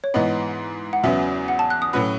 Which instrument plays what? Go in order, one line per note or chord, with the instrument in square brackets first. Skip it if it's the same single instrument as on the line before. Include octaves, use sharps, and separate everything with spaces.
[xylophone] C#5
[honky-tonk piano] G#2 E3 B3 [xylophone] D#5
[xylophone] F#5
[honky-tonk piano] E2 C#3 F#3 B3 [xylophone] E5
[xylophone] F#5
A5
F#6
D#6
[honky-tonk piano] A2 F#3 C#4 F#4 B4